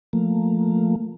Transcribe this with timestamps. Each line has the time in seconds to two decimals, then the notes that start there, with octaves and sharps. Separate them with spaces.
0.13 F3 A3 A#3